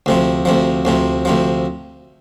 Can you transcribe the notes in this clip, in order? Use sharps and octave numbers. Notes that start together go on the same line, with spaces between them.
D2 C3 F3
D2 C3 F3
D2 C3 F3
D2 C3 F3